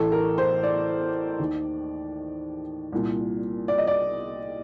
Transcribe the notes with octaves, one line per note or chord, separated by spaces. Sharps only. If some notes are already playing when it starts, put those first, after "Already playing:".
Already playing: A1 A2 A4
A#4
C5
D5
D#2 D#3
C2 A#2
D5
D#5
D5